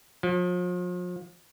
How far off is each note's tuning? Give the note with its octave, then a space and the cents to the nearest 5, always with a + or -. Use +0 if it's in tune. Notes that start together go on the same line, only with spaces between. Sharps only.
F3 +40